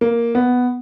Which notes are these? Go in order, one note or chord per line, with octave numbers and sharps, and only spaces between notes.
A#3
B3